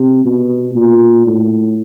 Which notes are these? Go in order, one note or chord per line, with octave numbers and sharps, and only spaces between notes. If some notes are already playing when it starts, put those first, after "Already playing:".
Already playing: C3
B2
A#2
A2